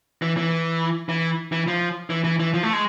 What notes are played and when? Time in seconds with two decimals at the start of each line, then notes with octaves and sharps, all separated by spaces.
0.22 E3
0.37 E3
1.09 E3
1.52 E3
1.68 F3
2.10 E3
2.24 E3
2.40 E3
2.54 F3
2.63 A3
2.73 G#3